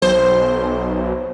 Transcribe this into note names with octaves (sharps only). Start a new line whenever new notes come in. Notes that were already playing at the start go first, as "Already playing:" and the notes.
B1 C5